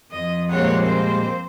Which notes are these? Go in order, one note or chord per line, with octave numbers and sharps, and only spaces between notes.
F2 D#5
A#2 G3 G#3 A#3 C4 C#5 F#5
C5